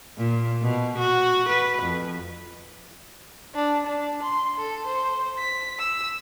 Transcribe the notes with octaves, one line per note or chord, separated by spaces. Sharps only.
A#2
B2
F#4
B4
F2
D4
D4
C6
A4
C5
B6
E6